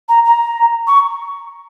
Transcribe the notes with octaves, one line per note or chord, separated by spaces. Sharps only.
A#5
A#5
C#6